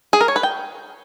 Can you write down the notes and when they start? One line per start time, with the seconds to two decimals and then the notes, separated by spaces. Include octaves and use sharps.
0.13 G#4
0.21 A#4
0.28 C#5
0.36 B4
0.43 G5